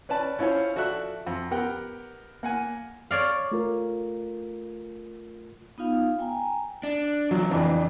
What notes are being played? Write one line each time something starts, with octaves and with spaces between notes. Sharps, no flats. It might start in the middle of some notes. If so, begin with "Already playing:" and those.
C#4 B4 D5 A5
C#4 E4 F4 C5 C#5
F3 F#4 A4 D5 E5 F#6
F2
B3 G4 A#4 F#5 G5
A#3 F#5 G#5
C#5 D5 F5
A3 F4 A#4
B3 D#4 F4 F5
G5 G#5 A#5
D4
E2 C#3 F#3
F2 E3 D4